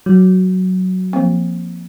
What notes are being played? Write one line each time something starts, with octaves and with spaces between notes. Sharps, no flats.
F#3
F3 A#3 C4